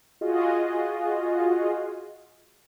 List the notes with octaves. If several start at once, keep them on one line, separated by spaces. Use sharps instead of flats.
F4 F#4 G#4 D#5